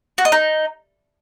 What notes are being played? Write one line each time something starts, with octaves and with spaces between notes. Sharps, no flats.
F#4
D#5
D#4